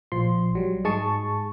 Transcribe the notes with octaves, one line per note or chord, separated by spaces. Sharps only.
A#1 F3 C6
F#3 G3
G#2 G#3 G#4 A5 C#6